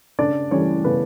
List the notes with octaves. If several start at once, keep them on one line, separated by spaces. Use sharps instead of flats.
C#3 D4 D5
E3 G3 C#4 C#5
C#3 B3 B4